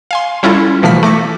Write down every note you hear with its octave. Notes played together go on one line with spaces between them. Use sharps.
F5 G#5 C6
G3 C#4 E4 F4 A4
B2 E3 F3 A3 F6 B6
A3 D6 A#6 C#7